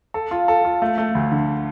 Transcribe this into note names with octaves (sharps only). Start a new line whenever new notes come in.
A4
F4
A4
F4
A3
A3
D2
D3